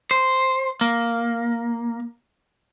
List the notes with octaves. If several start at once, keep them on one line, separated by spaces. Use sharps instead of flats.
C5
A#3